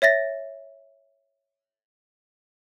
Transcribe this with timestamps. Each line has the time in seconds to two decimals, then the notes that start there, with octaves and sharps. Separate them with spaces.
0.02 C#5 E5 A6 A#6